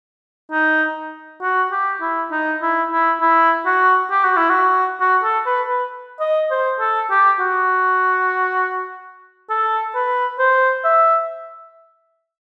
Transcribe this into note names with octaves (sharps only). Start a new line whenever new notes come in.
D#4
F#4
G4
E4
D#4
E4
E4
E4
F#4
G4
F#4
E4
F#4
F#4
A4
B4
B4
D#5
C5
A4
G4
F#4
A4
B4
C5
E5